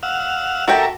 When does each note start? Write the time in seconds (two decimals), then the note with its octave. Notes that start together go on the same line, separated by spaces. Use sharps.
0.03 F5 F#5 E6
0.68 F#4 G4 A4 A#4 E5 G5